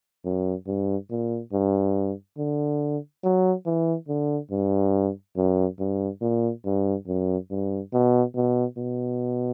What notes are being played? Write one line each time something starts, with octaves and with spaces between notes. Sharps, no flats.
F#2
G2
A#2
G2
D3
F#3
E3
D3
G2
F#2
G2
A#2
G2
F#2
G2
B2
B2
B2